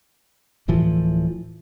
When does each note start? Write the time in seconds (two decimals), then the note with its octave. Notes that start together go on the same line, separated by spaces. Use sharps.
0.68 D1 A2 E3 F3